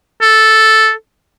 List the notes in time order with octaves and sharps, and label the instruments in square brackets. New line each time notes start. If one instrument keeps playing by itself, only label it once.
[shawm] A4